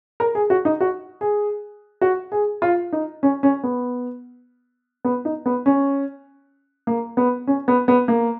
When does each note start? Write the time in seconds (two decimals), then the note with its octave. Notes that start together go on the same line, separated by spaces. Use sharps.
0.20 A#4
0.35 G#4
0.50 F#4
0.65 D#4
0.80 F#4
1.21 G#4
2.01 F#4
2.32 G#4
2.62 F4
2.93 D#4
3.23 C#4
3.43 C#4
3.63 B3
5.05 B3
5.25 D#4
5.46 B3
5.66 C#4
6.87 A#3
7.17 B3
7.47 C#4
7.68 B3
7.88 B3
8.08 A#3